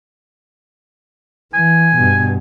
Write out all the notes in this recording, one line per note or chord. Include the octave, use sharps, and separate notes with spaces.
E3 G#5
G2 B2